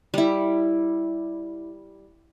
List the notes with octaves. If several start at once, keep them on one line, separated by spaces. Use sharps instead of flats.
G3 E4